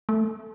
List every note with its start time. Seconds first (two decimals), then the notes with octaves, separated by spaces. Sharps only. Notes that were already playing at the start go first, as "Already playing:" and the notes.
0.09 A3